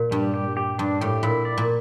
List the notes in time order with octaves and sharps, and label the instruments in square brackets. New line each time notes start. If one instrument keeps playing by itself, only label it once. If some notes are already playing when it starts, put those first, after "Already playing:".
Already playing: [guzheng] A#2
[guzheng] G2 [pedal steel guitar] G3
[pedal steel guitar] G4
G4
[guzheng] G2 [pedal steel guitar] D4
[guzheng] A2 [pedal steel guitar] G4
[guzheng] A#2 [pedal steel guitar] E4
[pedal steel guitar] D5
[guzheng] A#2